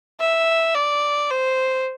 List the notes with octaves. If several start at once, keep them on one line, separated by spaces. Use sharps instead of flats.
E5
D5
C5